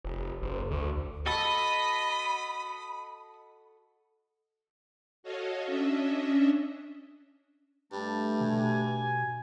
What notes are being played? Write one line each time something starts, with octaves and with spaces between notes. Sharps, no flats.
F1
F#1
D2
F#4 A4 D#5 B5 D#6 B6
F#4 A4 C#5 D#5 F5
C#4 D4 D#5 E5
G2 A3 A5
B2 G#5